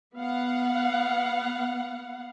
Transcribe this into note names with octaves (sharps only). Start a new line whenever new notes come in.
B3 F5 F#5